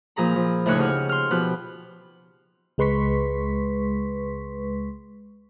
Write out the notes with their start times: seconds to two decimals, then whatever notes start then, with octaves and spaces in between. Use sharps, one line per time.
0.16 A#2 F3 G#4 A#5 B5
0.36 F3
0.66 D2 A2 C#3 D#4 C#5 F#6
0.79 G4 G#4 C#5 F#5 F6
1.09 C6 F6
1.31 B2 F3 G4 B5 F#6
2.78 C#2 G#3 B4 C6 C#6 B6